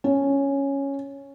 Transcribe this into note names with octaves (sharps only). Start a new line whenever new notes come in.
C#4